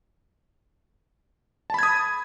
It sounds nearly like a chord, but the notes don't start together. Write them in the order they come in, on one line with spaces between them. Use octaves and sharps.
A5 B5 G#6 D#6